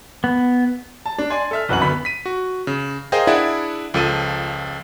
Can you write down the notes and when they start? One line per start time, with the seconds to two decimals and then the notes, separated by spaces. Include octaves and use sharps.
0.24 B3
1.06 A5
1.18 D4
1.30 D5 G#5 C6
1.51 A4 E5 F6
1.69 C2 F#2 E3 B4 F#5 F#7
1.81 D2 B3 B5 B6
2.05 B6 D#7
2.26 F#4
2.67 C#3
3.12 G#4 A#4 C5 D#5 F5 G5
3.27 D4 E4 G#4 D5 E5 F#5
3.94 C#2 F3 A4 D#7